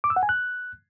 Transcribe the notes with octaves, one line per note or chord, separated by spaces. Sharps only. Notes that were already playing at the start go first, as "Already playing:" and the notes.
D6
E6
F#5
G#5
F#6